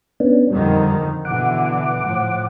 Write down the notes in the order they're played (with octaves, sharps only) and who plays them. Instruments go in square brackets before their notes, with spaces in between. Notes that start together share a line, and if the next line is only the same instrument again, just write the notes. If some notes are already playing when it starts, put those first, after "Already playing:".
[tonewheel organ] B3 C#4 D4
[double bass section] F2 D3 D#3 [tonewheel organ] G3
[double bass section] B2 D3 E3 [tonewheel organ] F#5 D6
[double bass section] A2 F3